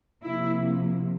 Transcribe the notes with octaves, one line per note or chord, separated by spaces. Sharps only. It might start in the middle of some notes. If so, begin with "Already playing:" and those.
C3 F3 A#3 E4